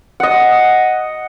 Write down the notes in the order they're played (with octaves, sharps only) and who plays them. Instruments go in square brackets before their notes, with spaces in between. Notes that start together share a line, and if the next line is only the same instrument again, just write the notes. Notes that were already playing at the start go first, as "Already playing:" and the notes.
[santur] D#5 F#5